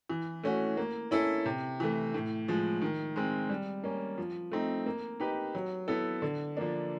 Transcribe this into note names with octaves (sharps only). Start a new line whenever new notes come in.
E3
A3 C#4 F#4
A#3
C#4 E4 A4
C3
E3 A3
A2
F3 G#3
D#3
G#3 C4
G3
A#3 C#4
F3
A3 C4 D#4
A#3
D#4 G4 B4
F#3
B3 E4 A4
D3
F3 A#3 D4